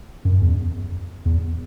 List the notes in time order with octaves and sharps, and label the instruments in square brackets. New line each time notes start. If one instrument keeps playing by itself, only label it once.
[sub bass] F#2
E2
E2